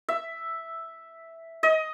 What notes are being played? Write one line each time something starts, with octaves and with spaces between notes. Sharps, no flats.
E5
D#5